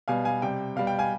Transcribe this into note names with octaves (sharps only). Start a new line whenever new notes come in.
B2 G3 F5 G#5
F5 G#5
C3 G3 G5
B2 G3 F5
G5
F5 G#5